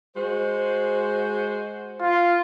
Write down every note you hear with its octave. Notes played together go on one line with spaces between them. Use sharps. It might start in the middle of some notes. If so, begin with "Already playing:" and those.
G#3 F#4 C5
F4